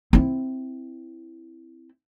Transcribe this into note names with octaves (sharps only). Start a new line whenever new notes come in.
C4 E4